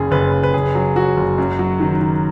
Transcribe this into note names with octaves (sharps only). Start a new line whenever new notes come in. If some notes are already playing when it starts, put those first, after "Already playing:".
Already playing: F#1 C#3 G#4
F#1 B4
F#1
B4
F#1 G#4
F#3
F#3 F#4
F#1
F#2
F#3
D#3
D#3